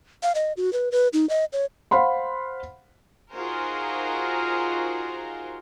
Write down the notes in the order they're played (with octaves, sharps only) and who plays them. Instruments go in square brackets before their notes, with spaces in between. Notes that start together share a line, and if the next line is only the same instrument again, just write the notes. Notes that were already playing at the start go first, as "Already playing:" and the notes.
[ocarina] F5
D#5
F#4
B4
B4
D#4
D#5
C#5
[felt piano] C5 F5 F#5 B5 C6
[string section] D#4 F4 F#4 G#4 A#4 C5